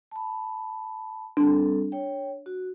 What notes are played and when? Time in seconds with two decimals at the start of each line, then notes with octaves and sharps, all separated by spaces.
0.11 A5 B5
1.37 G3 C4 D4 A4
1.92 C#5 G5
2.46 F#4